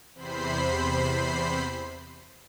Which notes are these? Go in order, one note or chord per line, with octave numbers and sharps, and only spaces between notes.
E2 C3 C5 B5 C7